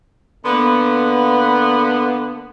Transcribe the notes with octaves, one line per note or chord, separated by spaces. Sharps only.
D3 A#3 B3